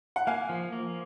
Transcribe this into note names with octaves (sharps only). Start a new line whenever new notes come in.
F#5
A#3 F5 G#5
F3
A#3